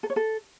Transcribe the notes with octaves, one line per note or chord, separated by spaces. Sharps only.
A4
C#5
A4